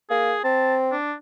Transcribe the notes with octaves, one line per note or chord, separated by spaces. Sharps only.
A#3 G#4
C4 A5
D4